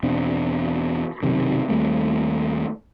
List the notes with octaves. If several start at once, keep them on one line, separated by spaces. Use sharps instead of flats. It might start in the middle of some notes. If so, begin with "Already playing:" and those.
E2 B2 C4 D4
B1 F#2 C3 D#3
D#2 G3 A3 C4